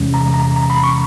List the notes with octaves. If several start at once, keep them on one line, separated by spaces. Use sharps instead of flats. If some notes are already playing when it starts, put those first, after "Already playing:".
Already playing: E2 C3 E3 G#3 C#4
A#5
A#5
A#5
B5
C#6